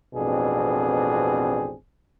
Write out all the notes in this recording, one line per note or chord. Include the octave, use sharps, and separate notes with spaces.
A1 F2 B2 C4 D4 G#4